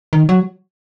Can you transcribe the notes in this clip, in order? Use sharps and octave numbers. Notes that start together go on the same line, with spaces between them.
D#3
F#3